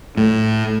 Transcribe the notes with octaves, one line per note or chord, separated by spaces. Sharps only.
A2